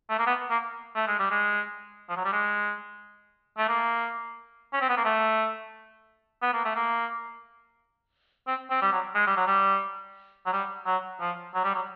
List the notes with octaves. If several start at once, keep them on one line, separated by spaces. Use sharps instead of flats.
A3
A#3
B3
A#3
A3
G#3
G3
G#3
F3
F#3
G3
G#3
A3
A#3
C#4
C4
B3
A#3
A3
B3
A#3
A3
A#3
C4
C4
G3
F#3
G#3
G3
F#3
G3
F#3
G3
F#3
F3
F#3
G3
F#3